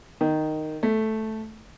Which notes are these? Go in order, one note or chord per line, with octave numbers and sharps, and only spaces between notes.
D#3
A3